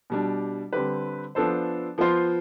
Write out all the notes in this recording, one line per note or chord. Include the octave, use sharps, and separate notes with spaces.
B2 G3 D4
D3 G3 C4 G4 B4
F3 B3 D4 A4 C5
F3 B3 F4 C5